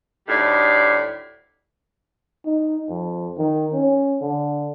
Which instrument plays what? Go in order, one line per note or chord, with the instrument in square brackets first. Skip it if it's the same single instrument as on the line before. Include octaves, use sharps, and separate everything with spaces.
[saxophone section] D2 A2 G3 D#4 D5
[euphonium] D#4
F2
D#3
C#4
D3